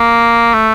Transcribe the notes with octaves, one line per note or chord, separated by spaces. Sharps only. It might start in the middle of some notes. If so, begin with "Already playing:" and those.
Already playing: A#3
A3